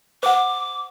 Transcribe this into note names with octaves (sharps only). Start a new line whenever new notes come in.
C5 F#5 D6